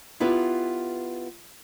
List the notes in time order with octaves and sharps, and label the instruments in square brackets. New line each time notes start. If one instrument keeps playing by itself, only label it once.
[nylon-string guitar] B3 E4 F4 G4 B4